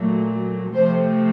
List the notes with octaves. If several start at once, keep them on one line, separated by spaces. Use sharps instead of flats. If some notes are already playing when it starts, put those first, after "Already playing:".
Already playing: A#2 F#3 A3
C3 F3 A3 C5